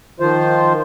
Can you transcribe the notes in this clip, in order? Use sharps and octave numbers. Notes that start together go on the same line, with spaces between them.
D#3 F3 F4 C5